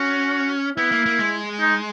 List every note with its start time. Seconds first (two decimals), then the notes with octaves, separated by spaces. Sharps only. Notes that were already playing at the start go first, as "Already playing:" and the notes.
Already playing: C#4 F#4
0.77 B3 E4
0.92 A#3
1.06 A#3
1.19 G#3
1.60 D#4